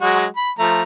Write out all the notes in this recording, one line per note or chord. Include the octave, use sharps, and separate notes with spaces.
F#3 G#3 F#4
B5
F3 A3 A#5